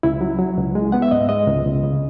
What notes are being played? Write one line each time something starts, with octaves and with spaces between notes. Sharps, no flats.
C#2 E4
F#3
F#3
C#2
G#3
B3 F#5
E5
G#2 D#5
G#3 D#5
C#2
C#2
C#3